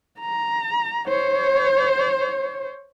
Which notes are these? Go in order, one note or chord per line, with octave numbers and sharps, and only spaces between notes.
A#5
C5 C#5